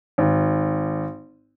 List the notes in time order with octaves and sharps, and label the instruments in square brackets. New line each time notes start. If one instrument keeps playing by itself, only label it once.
[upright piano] G#1